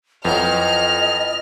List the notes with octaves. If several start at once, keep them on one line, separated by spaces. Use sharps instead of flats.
F2 E3 F#3 D#5 A#5 F6